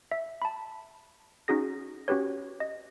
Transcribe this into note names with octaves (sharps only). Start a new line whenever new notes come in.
E5
A5 B5
C#4 D#4 F#4 G#4 A#6
C#4 F#4 G4 B4 C#5
D#5